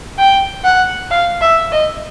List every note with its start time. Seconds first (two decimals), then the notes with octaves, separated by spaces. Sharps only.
0.18 G5
0.64 F#5
1.11 F5
1.41 E5
1.72 D#5